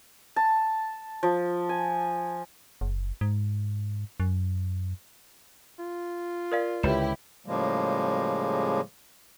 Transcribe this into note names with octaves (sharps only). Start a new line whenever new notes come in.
A5
F3
G#5
F#1
G#2
F#2
F4
A#4 D5 F5
C#2 D3 E4 G4 B4 C#5 E7
A2 C#3 F3 G3 G#3 A#3